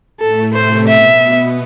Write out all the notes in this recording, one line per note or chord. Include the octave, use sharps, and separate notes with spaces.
A2 A3 A4
C3 C4 C5
B2 B3 E5
B2 B3